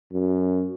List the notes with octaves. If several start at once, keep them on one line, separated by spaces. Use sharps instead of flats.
F#2